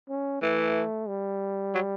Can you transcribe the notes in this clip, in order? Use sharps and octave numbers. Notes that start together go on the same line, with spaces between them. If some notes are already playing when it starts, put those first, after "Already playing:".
C#4
E3 A3
G3
F#3